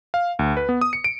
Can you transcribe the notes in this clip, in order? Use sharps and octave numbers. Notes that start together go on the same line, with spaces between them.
F5
D2
B4
B3
D#6
C#7
D7